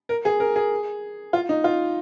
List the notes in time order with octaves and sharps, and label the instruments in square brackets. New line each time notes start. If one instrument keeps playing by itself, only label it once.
[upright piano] A#4
G#4
A#4
G#4
F4
D#4
F4